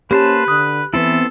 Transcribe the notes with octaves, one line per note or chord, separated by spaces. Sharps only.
A#3 C#4 G4 B4 C5 A5
D3 D#6 F#6
E3 B3 C4 E4 A4